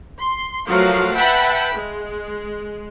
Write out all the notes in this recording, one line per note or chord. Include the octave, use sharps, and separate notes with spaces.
C6
F3 F#3 A3 F#4 A#4 F5
B4 E5 F#5 G5 A5 B5
G#3